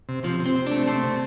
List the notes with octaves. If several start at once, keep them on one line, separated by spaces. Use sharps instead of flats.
C3
C3 F3
C3
C4
C3
A3 D4
A3 C4
C3